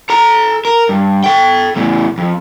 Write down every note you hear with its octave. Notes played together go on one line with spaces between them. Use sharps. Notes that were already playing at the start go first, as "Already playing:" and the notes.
A4 A#5
A#4
G2
A4 G5
E2 A2
F2